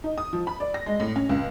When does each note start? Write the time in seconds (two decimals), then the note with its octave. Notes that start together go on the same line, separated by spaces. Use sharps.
0.04 D#4
0.18 D#6
0.33 F3
0.47 B5
0.60 D5
0.74 A#6
0.86 G#3
1.00 A2
1.16 C#4
1.29 C#2